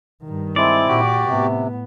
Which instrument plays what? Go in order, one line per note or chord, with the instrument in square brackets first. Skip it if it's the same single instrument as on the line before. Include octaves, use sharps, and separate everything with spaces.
[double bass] G2 D#3
[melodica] G#3 [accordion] C4 E4 [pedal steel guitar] D5
[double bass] A#2 [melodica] F#4 G4
[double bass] A2 B3 [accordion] C3